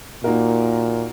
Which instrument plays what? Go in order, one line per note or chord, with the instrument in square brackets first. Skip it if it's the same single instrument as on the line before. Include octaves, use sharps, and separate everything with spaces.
[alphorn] A#2 [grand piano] A#3 D#4 F#4 A#4